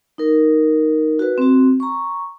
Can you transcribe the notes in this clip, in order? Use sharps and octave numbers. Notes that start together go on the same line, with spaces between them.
D#4 A#4
F#4 B4
C4 F#4
A#5 C#6